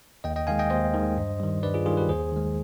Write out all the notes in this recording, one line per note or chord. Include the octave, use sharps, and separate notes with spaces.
D#2 D#5 G5
D#5 G5
D#3 G#3 F5 G#5
D#5 G5
D#2 C5 D#5
D#3 G#3
G2
D#3 G3
G2 B4 D5
F4 G#4
D#3 G3 F4 G#4
G4 B4
D#2 G#4 C5
D#3 G#3